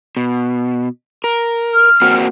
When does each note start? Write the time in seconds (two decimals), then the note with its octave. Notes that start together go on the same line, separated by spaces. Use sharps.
0.17 B2
1.24 A#4
1.74 F6
2.02 A#3 C4 F#4